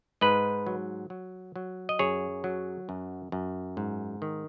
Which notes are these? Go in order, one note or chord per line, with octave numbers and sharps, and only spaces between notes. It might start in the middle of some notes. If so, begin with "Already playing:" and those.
G#2 B4 D#5
F#3
F#3
F#3
D#5
F#2 G#4 C#5
F#3
F#2
F#2
G#2
D#3